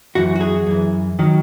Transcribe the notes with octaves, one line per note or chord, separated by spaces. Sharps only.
F#2 E3 F#4
F#4
G#4
F#2 E3
D#3 F#3